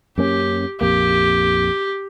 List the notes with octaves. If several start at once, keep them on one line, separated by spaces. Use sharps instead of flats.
F#2 A#3 C#4 G4
A#1 F2 A#3 G4